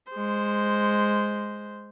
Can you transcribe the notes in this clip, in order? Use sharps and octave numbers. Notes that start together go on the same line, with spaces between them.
G#3 C5